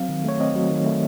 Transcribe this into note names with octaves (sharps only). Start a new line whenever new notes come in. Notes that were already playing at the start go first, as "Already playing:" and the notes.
Already playing: F#3 C4 F5
D#3
A3 C#5
C4 D#5
F#3
D#3
A3